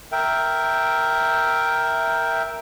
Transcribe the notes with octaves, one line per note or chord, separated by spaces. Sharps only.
A#4 E5 G5